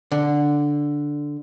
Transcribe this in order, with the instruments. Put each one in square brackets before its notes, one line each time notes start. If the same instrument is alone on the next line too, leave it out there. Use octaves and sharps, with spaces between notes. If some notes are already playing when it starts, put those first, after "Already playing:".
[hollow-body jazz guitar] D3